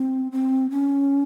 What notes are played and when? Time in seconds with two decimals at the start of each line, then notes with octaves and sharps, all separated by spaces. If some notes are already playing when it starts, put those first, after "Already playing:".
Already playing: C4
0.32 C4
0.71 C#4